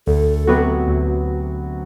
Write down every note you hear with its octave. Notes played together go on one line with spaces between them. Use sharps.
D2 A4
C3 F#3 B3 F#4
D2